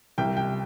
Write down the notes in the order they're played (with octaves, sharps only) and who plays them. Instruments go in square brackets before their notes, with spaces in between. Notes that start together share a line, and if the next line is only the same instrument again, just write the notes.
[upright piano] C2 G5
G5